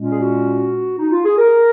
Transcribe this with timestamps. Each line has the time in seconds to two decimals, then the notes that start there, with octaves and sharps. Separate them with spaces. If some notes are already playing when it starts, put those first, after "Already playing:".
Already playing: A#2 G#3 C#4
0.10 G#4
0.19 F#4
0.99 D#4
1.12 F4
1.25 G#4
1.38 A#4